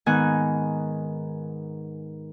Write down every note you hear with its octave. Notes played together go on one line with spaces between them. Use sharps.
G#2 D#3 B3 G#5 F#6